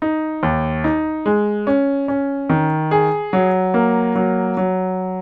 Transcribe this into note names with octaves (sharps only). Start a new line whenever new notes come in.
D#4
D#2
D#4
G#3
C#4
C#4
D#3
G#4
F#3
A#3
F#3
F#3